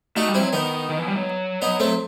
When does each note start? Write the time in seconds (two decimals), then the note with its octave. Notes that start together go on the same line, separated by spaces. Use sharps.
0.16 A3 D#4 F#4
0.29 G3
0.34 C4 E4
0.41 F#3
0.53 D#3 B3 D#4
0.89 D#3
0.99 E3
1.08 G3
1.16 F#3
1.62 B3 D#4
1.80 A3 C4